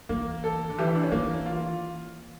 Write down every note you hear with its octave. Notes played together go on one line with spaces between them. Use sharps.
E3 A#3
A4
D3
E3 G4
E4
D4
C#4
E3 A#3
F4